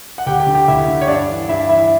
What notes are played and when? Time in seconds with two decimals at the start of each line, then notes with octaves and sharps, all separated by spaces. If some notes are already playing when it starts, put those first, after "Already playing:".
0.18 F#5
0.26 D2 G4 G5
0.40 G4 G5
0.47 D3
0.55 G4 G5
0.68 D2 E4 E5
0.88 D3
1.01 C#5
1.08 G2 D4 D5
1.29 E3
1.49 G2 E4 E5
1.69 E3 E4 E5